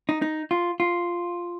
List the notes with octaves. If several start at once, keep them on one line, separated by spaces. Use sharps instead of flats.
D#4
D#4
F4
F4